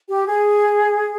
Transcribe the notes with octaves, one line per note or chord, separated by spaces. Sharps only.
G4
G#4